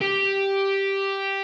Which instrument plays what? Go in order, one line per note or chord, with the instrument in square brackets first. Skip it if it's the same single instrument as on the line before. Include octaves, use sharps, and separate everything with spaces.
[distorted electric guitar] G4